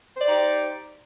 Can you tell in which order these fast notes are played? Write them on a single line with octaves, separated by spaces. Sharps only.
C5 D5 D#4 G4